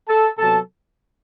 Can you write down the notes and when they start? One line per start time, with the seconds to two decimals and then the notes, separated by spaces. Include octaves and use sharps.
0.08 A4 A5
0.38 C3 F#3 B3 A4 A5